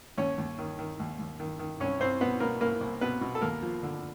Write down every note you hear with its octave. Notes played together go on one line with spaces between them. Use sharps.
D#2 C#4 C#5
D#2
D#3
D#3
D#2
D#2
D#3
D#3
C2 C#4 C#5
C2 C4 C5
B2 B3 B4
B2 A#3 A#4
C2 A#3 A#4
C2
B2 B3 B4
B2
A4
D#2 A#3 A#4
F3
D3